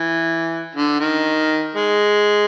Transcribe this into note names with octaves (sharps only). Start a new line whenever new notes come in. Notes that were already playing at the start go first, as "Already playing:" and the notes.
Already playing: E3
D3
D#3
G#3